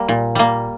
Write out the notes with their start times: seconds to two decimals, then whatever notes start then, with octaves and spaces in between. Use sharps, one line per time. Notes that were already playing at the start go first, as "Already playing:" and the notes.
Already playing: G3 A#3
0.08 A#2
0.35 G3 A#3